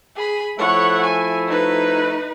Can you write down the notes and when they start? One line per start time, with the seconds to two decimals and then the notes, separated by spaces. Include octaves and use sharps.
0.16 G#4 B5
0.58 F3 A3 E4 C#5 F#5
1.03 G#5
1.47 D#4 B4